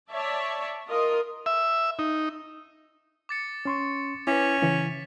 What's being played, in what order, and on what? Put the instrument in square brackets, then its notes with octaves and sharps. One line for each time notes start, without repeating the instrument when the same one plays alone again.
[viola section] C#5 D5 E5 A5
F4 A#4 D#5
[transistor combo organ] E5
D#4
[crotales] D6 A6 C#7
[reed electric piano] C#4 C6 C#6
[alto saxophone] C#4 [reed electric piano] E4 B4 [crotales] D6 B6
[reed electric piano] C#3 E3